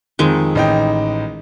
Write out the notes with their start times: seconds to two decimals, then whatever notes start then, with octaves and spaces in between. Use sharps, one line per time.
0.19 F2 D#3 G#3
0.55 A1 D#4 G5